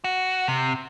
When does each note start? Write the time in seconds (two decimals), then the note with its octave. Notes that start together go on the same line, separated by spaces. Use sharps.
0.04 F#4
0.48 C3